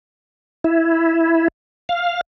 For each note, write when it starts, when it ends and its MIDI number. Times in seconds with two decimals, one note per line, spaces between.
0.64 1.48 64
1.89 2.21 77